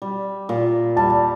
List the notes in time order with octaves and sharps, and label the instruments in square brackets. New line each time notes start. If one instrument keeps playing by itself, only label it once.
[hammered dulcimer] G3
A#2
[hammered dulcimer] G3 [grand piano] A5